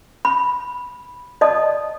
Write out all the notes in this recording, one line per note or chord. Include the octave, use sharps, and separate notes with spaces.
B5
D5 D#5 A5 D#6